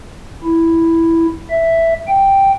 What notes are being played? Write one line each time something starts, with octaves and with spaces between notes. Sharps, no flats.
E4
E5
G5